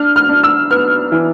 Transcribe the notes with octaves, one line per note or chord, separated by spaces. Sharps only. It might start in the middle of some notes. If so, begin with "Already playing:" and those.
Already playing: D4 F6
F6
D4
E6
B3 F6
E3